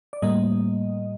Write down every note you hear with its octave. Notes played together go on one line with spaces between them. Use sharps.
D5
A2 G3 A#3 D#5